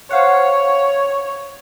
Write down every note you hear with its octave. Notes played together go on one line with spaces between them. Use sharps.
C5 C#5 F5 F#5